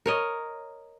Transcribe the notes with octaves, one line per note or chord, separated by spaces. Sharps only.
A#4 C#5 D#5